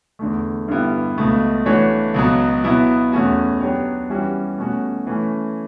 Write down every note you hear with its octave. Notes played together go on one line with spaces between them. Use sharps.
E2 D3 A3
G2 D3 G3 B3 E4
C#2 B2 A3
E3 A3 D4 F#4 C#5
C#2 B2 F#3
B2 F#3 B3 E4
E2 B2 A3 C#4 F#4
F#3 B3 D4 G4 C#5
E3 G3 C#4 F#4
B2 A3 C#4 F#4
E3 A3 C#4